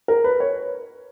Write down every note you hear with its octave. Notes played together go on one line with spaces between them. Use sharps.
A#4
B4
C#5